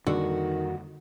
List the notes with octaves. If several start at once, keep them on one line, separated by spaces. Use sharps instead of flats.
F2 D3 D#3 G3 A#3 F#4